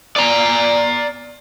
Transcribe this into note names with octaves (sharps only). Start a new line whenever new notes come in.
D5 A#5